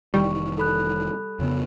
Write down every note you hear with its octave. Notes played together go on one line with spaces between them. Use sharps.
F1 D#3 E3 G3 C#6
A4 B5 F#6
F2 C#3 B3